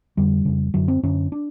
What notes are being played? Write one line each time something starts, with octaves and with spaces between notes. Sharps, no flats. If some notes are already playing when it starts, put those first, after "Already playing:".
F2 D3 G3
F2 C#3
F#2 D3 F#3
C4
F#2 D3 C#4
D4